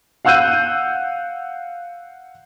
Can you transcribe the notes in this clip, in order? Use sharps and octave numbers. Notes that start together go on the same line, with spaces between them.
F5 F#5 E6 F#6 G6 D#7